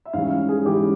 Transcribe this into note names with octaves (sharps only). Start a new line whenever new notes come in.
E5
G#2 E3 G3 C#4 F5
F5
G#4
G#2 E3 G3 C#4 G4